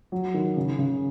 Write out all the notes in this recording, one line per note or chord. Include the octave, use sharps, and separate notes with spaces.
F#3
D#3
C#3
C#3